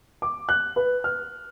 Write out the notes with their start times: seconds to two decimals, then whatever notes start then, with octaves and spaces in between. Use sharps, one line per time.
0.22 D6
0.49 F#6
0.76 B4
1.04 F6